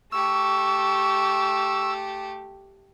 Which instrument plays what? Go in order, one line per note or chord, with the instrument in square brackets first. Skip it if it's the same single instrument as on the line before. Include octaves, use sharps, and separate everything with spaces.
[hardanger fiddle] A3 G4 [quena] C#6 [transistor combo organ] E6